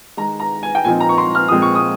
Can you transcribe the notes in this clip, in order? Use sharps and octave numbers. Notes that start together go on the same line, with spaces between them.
D#3 G#3 D#4 A#5
A#5
G#5
G5
A#2 F3 C4 D#4 G#5
A#5
C#6
C6
F6
A#2 F3 G#3 C4 D#6
C#6
D#6